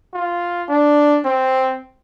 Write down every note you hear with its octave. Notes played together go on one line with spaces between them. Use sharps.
F4
D4
C4